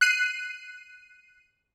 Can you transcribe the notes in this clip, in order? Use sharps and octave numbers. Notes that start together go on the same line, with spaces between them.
F#6 C7 D#7